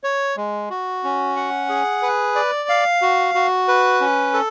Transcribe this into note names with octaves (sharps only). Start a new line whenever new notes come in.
C#5
G#3
F#4
C#4
F#5
G#4
B4
D5
F5
F#4
F#4
B4
C#4
A4